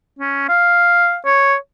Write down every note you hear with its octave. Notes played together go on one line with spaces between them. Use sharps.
C#4
F5
C#5